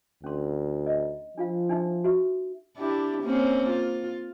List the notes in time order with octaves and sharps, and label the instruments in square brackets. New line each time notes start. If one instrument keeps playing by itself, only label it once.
[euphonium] D2 [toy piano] C#4 C6
[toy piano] D#5
[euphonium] F3 [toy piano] D4 F4 F5
[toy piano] D4 D#4 E5
F#4 E5
[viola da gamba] D4 E4 G4
A#3 C4 C#4
F4